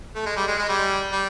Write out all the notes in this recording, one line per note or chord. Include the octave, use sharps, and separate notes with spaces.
A3
G#3
G3
G#3
G#3
G3
G3